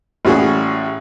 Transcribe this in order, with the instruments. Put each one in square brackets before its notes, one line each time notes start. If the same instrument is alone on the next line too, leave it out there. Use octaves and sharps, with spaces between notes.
[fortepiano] A1 G3 C#4 F#4 G#4